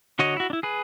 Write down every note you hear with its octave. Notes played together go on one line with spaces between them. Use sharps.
D3 F#4 C#5 D#5
E4 F#4
D4 E4
G#4 B4